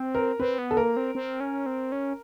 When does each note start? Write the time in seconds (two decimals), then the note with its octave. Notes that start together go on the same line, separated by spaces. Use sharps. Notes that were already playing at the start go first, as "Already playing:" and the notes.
Already playing: C4
0.15 A#4
0.40 C4 B4
0.59 B3
0.71 A4
0.77 A#3 A#4
0.97 C4
1.15 C4
1.40 C#4
1.66 C4
1.92 C#4